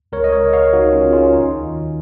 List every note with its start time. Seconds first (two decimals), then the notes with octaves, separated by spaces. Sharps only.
0.12 C#2 A#4 C#5
0.24 D#5
0.32 A#4 C#5
0.43 C#3
0.53 C#5 F5
0.73 C#2 D#4 F#4
0.92 C#4 F4
1.03 C#3
1.13 C#4 F4
1.33 D#2 D#4
1.64 D#3